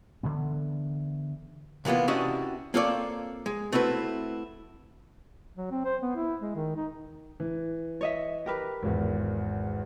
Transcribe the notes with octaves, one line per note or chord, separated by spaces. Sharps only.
D3 E3 B3
C3 E3 A#3 B3 F4
C3 C#4 D4 E4 F#4 D#5
A#3 C4 F4 A4 C#5 D5
G#3
A3 C4 E4 F#4 B4
F#3
C4
C5
B3
E4
G#3
D#3
D#4
E3
C#5 D#5 E5
G4 A#4 B4
G#1 E2